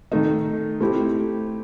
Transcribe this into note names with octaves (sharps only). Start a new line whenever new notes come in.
D#3 A3 D#4
A3 C4 E4 G4